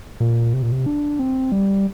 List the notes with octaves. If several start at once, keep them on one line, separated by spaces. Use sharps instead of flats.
A#2
C3
A#2
C3
D4
C4
G3